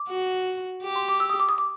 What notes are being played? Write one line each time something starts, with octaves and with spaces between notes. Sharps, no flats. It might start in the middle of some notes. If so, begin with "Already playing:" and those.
Already playing: D6
F#4
G4
C6
D6
E6
D#6
D6
D#6
D6